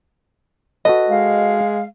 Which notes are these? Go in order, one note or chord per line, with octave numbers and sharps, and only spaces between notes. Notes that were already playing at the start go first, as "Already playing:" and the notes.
F#4 A4 B4 D#5
G#3 F5